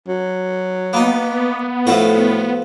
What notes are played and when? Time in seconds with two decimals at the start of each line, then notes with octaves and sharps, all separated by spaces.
0.08 F#3
0.93 A#3 B3 D#4
1.87 A2 F3 A3 F#4